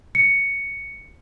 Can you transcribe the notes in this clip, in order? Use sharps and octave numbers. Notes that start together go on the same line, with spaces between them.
C#7